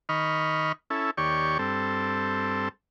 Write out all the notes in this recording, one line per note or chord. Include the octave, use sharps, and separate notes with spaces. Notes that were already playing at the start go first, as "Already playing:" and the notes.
D#3 D#5 B5 C#6 F6
C#4 E4 A4
D#2 G4 C#5 D5 C#6
G2 C4 A4